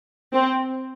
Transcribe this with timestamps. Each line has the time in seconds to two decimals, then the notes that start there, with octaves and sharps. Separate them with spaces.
0.33 C4